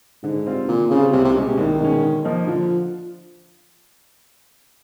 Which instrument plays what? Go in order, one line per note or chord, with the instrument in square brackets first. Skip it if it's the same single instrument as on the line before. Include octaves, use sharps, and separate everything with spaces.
[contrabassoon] G#2 [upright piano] D3
[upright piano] G3 C4 F4
[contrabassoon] A#2 [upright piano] D3
[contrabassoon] C#3 [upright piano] G3 C4 F4
[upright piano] C2 [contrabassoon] C3
[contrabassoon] C3
[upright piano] B2 G#3 C#4
[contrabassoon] C3
[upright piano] C2 [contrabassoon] D#3
[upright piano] B2 G#3 C#4
D3
F3 A#3 D#4
[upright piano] D3 [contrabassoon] F3